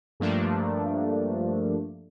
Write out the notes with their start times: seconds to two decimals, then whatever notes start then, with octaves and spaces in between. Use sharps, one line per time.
0.20 G2 F3 A3 A#3 D4